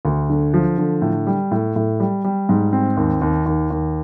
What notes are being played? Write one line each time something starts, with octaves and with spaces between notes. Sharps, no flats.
D2
D3
F3
D3
A2
G3
A2
A2
G3
G3
G#2
C4
D#2
D#2
D#2
D#2